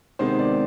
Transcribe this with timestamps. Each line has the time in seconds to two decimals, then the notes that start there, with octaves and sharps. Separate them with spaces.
0.19 C3 D#3 G#3 B3 C5
0.39 D5